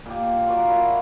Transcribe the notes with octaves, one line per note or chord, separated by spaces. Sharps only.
A#2 G4
F4 F#4 A#4 D5
E4 F#4